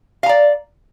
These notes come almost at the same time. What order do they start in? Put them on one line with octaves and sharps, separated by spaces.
F5 A#5 D5